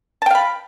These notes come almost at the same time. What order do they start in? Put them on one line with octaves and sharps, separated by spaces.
A5 G5 F5 B5